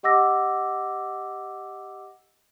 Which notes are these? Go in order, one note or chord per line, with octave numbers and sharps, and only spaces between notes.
G4 D#5 F#5 D6 E6 A#6